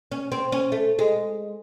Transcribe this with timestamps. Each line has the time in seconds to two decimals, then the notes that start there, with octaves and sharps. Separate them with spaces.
0.12 C#4
0.32 C4
0.52 C#4
0.72 A3
0.99 G#3